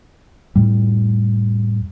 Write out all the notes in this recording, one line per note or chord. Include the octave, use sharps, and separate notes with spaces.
F2 A2 G3